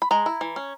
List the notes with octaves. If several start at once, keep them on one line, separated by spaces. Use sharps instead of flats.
B5
G#3 A#5
E4
E3
C#4